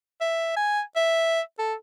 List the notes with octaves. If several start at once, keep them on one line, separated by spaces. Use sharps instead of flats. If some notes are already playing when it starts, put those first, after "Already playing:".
E5
G#5
E5
A4